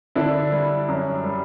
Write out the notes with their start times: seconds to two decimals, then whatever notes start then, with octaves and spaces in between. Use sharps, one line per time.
0.15 D3 D4 E4
0.52 G3
0.88 F#2
1.24 G3